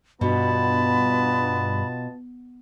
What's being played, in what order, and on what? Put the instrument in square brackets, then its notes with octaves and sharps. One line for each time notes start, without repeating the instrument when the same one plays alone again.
[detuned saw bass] G2 [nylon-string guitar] B2 [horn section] B3 F4 A5 [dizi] B5